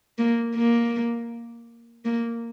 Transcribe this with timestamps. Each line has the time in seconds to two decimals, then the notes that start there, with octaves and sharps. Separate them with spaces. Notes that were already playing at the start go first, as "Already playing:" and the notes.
0.19 A#3
0.56 A#3
2.05 A#3